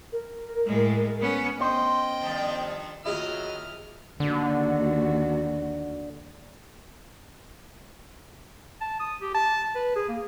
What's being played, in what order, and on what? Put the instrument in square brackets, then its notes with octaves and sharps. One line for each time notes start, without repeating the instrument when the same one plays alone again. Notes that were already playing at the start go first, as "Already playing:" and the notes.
[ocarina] A#4
[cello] A2 G#3
B3 C#4
[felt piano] B3 C#4 [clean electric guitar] C5 [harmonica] D#5 G5
[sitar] G2 D#3 F3
[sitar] D#2 E4 [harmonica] F#3 D#5 F6 [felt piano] F4 G#4 E5
[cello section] D#2 D#3 F#4 [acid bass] D3
[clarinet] A5
D#6
G4
A5
B4
G#4
A#3